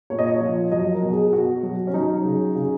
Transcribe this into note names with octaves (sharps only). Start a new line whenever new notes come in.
A#2 C#5
D#5
C#5
F3
F#3 D#5
A#4
B2
G#4
B2 F#4
F#3
C#4
F#3 D#4
C#3
C#3